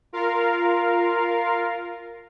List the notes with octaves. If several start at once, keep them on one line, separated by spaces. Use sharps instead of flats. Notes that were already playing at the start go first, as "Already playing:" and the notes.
F4 A#4 F5